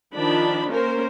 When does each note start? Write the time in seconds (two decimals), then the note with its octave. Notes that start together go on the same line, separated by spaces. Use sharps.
0.15 D#3 F3 D4 B5
0.70 A#3 C#4 A#4 C5